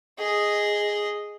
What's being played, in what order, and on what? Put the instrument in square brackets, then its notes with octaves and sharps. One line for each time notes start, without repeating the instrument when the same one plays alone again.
[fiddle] G#4 D#5